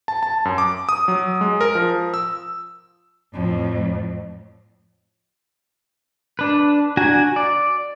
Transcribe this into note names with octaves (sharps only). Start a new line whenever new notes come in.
A5
A5
F#2
D6
D#6
F#3
G#3
A#4
F3
E6
F2 A2
D4 B4
D4 F#4 G#5 A#5
D5